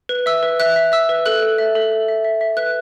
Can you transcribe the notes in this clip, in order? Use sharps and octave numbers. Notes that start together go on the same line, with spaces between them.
B4
E5 E6
B4
E5 F#6
E5
E5 E6
B4
A4 F#6
A4
E5
A4
E5
E5
E5
E5
B4 F#6